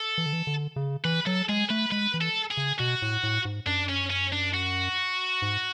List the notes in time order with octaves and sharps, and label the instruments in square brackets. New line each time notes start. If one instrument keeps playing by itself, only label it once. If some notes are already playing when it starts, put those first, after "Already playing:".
Already playing: [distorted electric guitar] A4
[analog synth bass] E3
D3
E3
D3
C#3
[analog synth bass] E3 [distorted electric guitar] B4
[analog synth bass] F#3 [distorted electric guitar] A4
[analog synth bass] G#3 [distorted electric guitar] G#4
[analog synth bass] A3 [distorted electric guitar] B4
[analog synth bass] G#3 [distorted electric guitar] B4
[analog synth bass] E3
[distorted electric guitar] A4
G#4
[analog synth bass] C#3
[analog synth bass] B2 [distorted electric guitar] F#4
[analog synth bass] A2
A2
G#2
[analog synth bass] F#2 [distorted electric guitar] D4
[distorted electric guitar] C#4
C#4
D4
F#4
[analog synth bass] G#2